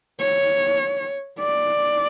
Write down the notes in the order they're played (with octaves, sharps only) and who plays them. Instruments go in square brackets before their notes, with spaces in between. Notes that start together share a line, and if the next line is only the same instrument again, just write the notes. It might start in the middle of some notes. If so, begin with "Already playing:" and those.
[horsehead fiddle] C#5
D5